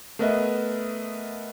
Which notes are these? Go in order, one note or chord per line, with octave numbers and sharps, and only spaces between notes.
A3 B3 A#4 B4 D#5 E5